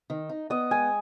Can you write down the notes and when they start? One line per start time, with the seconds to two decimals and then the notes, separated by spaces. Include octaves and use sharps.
0.10 D#3
0.29 D#4
0.50 B3 D#5
0.71 G#3 G#5